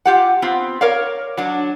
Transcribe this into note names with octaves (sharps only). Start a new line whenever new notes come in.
F4 G4 F#5
B3 C4 F4
A#4 C#5 D5 F5
F#3 D4